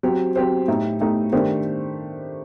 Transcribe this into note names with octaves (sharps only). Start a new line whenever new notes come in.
F#3 C4 G4 C5
F#3 C4 G4 C5
A2 A3 D#4 G4
A2 A3 D#4 G4
D#3 A3 D4 G4 C5